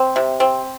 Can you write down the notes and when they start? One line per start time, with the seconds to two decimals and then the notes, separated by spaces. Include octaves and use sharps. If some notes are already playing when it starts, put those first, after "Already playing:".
Already playing: C4
0.16 C3
0.40 C4